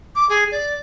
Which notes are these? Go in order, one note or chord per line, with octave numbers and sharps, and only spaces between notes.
D6
G#4
D5